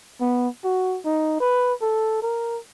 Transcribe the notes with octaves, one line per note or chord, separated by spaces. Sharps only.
B3
F#4
D#4
B4
A4
A#4